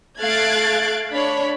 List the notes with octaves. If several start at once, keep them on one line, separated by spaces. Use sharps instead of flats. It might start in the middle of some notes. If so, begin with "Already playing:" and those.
A3 F5 F#6 G#6 A6 D7
D4 C#5 B5